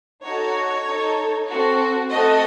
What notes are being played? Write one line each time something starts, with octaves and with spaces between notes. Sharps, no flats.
D#4 F#4 A4 C#5
D#4 A4
C4 F#4 A4
A3 C4 F#4 A4 D#5